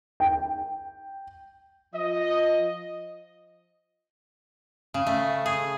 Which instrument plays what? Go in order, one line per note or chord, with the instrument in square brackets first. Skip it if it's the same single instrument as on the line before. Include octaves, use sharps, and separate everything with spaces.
[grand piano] G5
[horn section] F3 D#5
[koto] C#3
A3
G#4